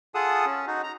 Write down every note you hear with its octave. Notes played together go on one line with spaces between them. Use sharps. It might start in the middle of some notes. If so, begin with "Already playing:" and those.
F4 G#4 A4 F#5 A5 D#6
C#4
D#4 F#4
A#5